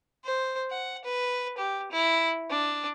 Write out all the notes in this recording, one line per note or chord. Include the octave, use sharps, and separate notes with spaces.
C5
F#5
B4
G4
E4
D4